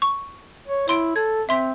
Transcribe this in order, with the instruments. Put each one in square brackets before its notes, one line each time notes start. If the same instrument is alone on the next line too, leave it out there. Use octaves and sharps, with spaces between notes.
[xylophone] C#6
[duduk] C#5
[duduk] E4 [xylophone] C#5 C6 D7
[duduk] A4 [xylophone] G#6
[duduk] C4 [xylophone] E5 C6 B6